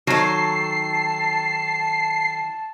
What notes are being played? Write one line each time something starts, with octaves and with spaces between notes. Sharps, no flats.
D#3 F#3 A4 A5 C7